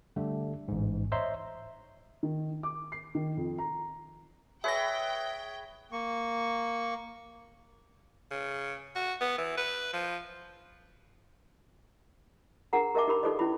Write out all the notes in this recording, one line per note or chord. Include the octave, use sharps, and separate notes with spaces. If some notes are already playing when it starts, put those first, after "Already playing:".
D3 G3 A3
A1 G#2
C5 C#5 D#5 E5 A#5 C6
D#3
D6
C7
D#3
F2
A#5
G#4 B4 C#5 E5 G5 A#6
A#3 C#6
C#3
F#4
B3
E3
B4
F3
D4 G#4 A#4 F#5 A#5
G4 A#4 D#5 E5 A5 D6
D#4 G4 A#4 B5
D#4 G4 A4 B4 D5 D#5
C#4 E4 B5